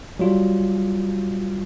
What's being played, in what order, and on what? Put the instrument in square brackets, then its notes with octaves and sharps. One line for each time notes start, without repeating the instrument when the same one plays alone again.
[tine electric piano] F#3 G3 F4